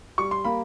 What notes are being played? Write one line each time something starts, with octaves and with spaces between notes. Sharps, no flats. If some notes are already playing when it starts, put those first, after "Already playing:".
G3 C#6
C6
A#3 B5